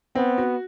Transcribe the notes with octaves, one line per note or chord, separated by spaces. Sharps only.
B3 C4
F#4